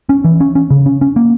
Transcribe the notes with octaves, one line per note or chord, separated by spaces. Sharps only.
C#4
E3
C#4
C#4
C#3
C#4
C#4
A#3